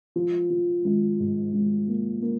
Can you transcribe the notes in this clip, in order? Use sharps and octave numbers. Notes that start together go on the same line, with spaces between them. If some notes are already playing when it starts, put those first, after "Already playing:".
F3
F3
G#1
G#2
G#1
A#3
A#3